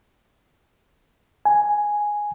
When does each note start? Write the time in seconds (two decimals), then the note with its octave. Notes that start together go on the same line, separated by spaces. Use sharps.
1.45 G#5